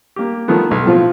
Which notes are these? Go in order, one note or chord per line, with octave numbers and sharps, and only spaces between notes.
A#3 G4
D#3 F3 A3 B3
B1
A2 F3 C4 F4